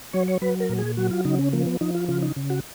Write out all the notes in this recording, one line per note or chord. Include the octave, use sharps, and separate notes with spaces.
F#3 C#5
C#5
F#3 B4
A#4
A#2
G#4
F#3 F#4
F4
C#3 D#4
C#4
F3 A#3
B3
F3 D#4
F4
C#3 F4
D#4
C#3
F#4